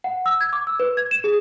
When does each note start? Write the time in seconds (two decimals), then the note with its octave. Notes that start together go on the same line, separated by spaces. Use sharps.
0.04 F#5
0.26 E6
0.41 G#6
0.53 D6
0.67 E6
0.80 B4
0.97 G#6
1.11 E7
1.24 G#4